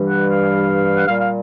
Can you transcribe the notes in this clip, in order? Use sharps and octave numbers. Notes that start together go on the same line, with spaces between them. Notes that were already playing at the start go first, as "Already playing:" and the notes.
Already playing: G2 E3 G3
F#5
F5
F#5
A#2 G3 F5
F5